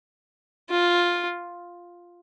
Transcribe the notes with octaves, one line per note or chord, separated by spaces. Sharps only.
F4